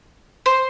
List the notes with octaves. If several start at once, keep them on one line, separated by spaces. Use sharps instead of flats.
C5